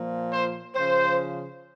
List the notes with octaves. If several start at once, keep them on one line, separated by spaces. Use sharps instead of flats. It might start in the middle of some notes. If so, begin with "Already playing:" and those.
Already playing: A#2 F3
C5
C#3 F3 C5